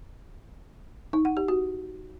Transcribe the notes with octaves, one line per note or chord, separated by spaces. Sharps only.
D#4
F#5
G4
F#4